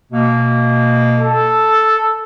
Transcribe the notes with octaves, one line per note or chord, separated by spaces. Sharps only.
B2 A#3
A4